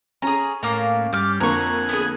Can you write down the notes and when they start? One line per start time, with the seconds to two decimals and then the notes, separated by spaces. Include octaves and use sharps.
0.22 C#4 G#4 A#5
0.63 A2 A#3 F5 A#5
1.13 G2 G3 D6 F6
1.40 F2 D3 A#3 F#5 G#5 A#5 C#6
1.89 B3 D4 G#4